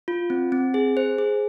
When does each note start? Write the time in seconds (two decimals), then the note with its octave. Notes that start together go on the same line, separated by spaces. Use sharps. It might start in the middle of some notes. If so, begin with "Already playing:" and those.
0.08 F4
0.30 C4
0.52 C4
0.74 G#4
0.97 C5
1.18 G#4